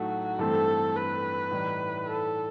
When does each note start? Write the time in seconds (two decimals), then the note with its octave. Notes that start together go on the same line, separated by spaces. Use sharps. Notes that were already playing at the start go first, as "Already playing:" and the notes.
Already playing: A2 F#3 A3 D#4 F#4 A4
0.39 G2 E3 A3 C4 A4
0.96 B4
1.51 A2 E3 G3 D#4
2.07 A4